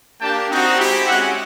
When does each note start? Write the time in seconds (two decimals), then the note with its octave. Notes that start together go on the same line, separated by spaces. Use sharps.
0.21 A#3 D4 G4 G5 A5
0.49 C4 D#4 F#4
0.78 G#3 C4 E4 G4
1.06 G#3 C#4 F#4 E5 F#5